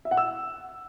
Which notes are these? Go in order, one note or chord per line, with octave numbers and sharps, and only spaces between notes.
E5
F#5
E6